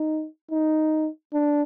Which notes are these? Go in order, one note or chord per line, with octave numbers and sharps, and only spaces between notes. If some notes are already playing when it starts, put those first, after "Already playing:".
Already playing: D#4
D#4
D4